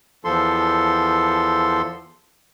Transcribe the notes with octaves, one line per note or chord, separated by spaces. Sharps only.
E2 F3 A4 C6